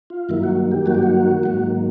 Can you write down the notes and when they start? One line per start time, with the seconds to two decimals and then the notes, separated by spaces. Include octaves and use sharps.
0.10 F4
0.29 G2 D#3 F#3 A#3 E4
0.43 F#4
0.71 G4
0.86 G2 D#3 F#3 A#3 F#4
0.95 G4
1.03 F#4
1.43 G#2 D#3 F#3 A#3 F#4